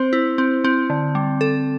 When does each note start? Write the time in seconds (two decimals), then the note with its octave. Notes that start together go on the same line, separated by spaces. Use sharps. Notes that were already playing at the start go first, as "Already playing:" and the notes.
Already playing: C4 C5
0.13 E4
0.38 C4
0.64 C4
0.90 D3
1.15 G3
1.41 A4